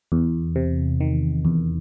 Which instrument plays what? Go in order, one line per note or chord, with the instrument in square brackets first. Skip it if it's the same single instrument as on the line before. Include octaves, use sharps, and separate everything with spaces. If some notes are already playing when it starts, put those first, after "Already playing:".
[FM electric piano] E2
C3
D#3
E2